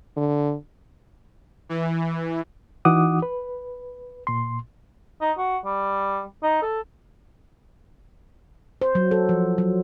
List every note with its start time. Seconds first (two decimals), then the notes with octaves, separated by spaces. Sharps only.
0.17 D3
1.69 E3
2.85 E3 D#4 F#4 F#5 D6 D#6
3.22 B4
4.27 A#2 C6
5.21 D#4
5.38 F#4
5.65 G3
6.43 D#4
6.62 A4
8.82 C5
8.95 F#3
9.11 A4
9.29 F3
9.58 F#3